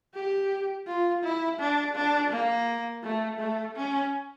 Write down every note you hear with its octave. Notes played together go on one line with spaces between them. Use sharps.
G4
F4
E4
D4
D4
A#3
A3
A3
C#4